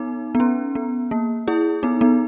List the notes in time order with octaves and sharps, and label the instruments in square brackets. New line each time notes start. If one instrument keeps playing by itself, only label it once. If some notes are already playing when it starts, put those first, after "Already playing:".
Already playing: [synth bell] B3 D#4
B3
C#4
B3
A#3
E4 G#4
B3 D#4
B3 D#4